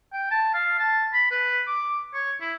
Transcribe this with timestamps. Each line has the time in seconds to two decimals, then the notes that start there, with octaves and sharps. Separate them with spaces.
0.13 G5
0.31 A5
0.54 F5
0.79 A5
1.14 B5
1.31 B4
1.67 D6
2.14 C#5
2.41 E4